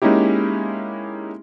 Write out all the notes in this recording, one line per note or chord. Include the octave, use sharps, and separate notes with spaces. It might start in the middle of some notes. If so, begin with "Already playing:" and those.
G#3 A#3 C#4 D#4 E4 G4